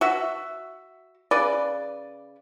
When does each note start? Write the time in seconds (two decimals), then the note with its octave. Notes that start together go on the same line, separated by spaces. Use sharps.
0.01 F#4 E5
1.31 C#3 B4 D5